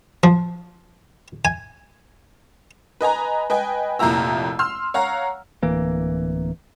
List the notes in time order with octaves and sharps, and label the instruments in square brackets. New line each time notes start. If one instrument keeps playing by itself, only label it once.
[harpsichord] F3
G#5
[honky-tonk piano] B4 D#5 G#5 A#5
B4 D#5 G5 G#5
F1 F2 A#2 E4 A#5 E6
C6 E6 F6
C#5 F5 F#5 A#5
[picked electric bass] D1 E3 A#3